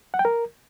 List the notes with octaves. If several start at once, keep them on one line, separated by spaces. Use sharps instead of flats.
F#5
G5
A#4